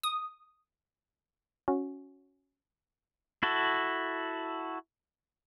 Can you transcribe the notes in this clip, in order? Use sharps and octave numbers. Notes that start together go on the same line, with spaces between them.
D#6
C#4 F#4
E4 F#4 A4